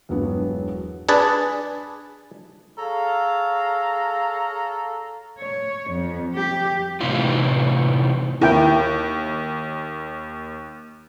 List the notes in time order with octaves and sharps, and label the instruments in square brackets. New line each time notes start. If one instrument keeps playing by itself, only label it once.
[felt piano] E1 G2 F#3 B3
[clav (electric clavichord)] D4 G#4 B4 A5
[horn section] G#4 A4 C#5 F5 A#5
[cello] C#5
F2
G4
[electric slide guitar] A2 C3 E3 D#4 F4
[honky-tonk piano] D#2 [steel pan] E4 A#4 G5